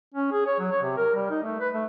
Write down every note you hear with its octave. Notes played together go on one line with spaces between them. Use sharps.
C#4
G#4
C#5
F#3
C#5
C3
A#4
G3
D#4
A3
B4
A3